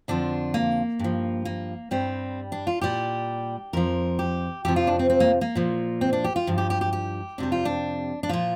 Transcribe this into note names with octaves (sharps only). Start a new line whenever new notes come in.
F2 D3 F3 D4
A#3
G2 F3
A#3
G2 G3 C4
D4
F4
A#2 G3 G4
F2 F3 A#4
G4
F2 C3 F3 G4
F4
D4
C4
C4
A#3
A#3
A#2 F3
C4
D4
G4
F4
G2 F3
G4
G4
G4
G4
F2 C3 G3 D4
F4
D4
D4
A#2 F3 F4